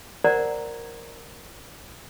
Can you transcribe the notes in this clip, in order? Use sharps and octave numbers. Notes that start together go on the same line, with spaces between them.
A#4 C5 D5 F#5 A#5